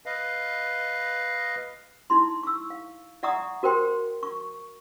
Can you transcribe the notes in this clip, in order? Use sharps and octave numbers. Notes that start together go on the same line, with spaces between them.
B4 D#5 F5
D#4 E4 C6
C#6 E6
F5
D5 E5 F#5 A#5 C#6 D#6
F#4 A#4 C5 G5 C6
C#6